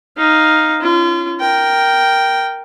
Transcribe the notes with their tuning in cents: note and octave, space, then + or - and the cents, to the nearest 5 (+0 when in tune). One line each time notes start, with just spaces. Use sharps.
D#4 +0 F5 +0
C#4 +0 F4 -35
A#4 +0 G5 -5